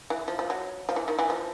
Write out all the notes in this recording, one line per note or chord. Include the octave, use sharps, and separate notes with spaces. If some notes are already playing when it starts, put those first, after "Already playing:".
E3
F3
F3
F#3
F3
E3
D#3
E3
F3